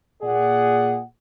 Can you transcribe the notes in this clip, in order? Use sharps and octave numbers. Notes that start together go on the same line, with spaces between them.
A#2 G#4 D5 F#5